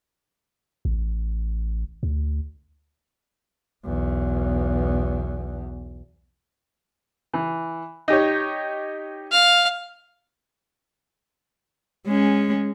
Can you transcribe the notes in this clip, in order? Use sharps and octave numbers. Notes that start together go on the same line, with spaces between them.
A1
D2
B1 E2
E3
D#4 G4 C#5
F5
G#3 C#4